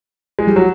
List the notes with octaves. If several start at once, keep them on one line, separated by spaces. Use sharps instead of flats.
G#3
G3
F#3